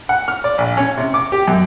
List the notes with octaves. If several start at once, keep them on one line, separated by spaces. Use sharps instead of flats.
F#5
F6
D5
A#1
C#4
C3
D6
G4
F#2